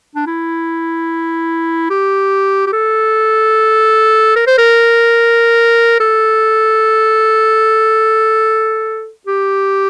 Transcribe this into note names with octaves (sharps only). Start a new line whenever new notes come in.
D4
E4
G4
G4
A4
A#4
C5
A#4
A4
G4